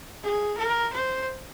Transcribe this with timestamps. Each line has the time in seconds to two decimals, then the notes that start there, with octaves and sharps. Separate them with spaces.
0.23 G#4
0.58 A#4
0.93 C5